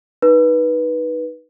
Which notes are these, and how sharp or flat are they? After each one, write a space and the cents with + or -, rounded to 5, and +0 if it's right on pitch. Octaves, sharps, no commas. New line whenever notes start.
D#4 +0 B4 -20